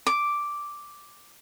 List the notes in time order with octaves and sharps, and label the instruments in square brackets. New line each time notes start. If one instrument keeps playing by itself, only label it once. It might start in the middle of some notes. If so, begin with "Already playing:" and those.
[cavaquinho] D6